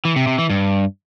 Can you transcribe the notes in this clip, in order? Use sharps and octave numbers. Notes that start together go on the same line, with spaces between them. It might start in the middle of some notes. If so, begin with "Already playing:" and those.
E3
C3
C3
E3
G2